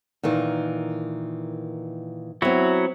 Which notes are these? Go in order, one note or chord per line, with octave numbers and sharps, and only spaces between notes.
A#2 D#3 E3
F#3 B3 C4 E4 F#4